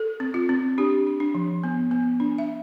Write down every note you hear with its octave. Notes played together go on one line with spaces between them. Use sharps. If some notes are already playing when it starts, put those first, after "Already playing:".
Already playing: A4
C4
F4
C4
D4 G4
D4
D4
F3
B3
B3
D4
E5